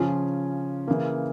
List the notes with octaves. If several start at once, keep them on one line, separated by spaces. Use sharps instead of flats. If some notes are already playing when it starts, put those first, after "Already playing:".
Already playing: C#3 F3 C#4 F4
C#3 E3 A#3